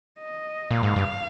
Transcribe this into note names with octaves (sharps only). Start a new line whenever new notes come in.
D#5
A#2 F5
G#2
G2